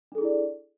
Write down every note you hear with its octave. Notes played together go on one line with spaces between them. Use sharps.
D4 E4 G#4 A4 D5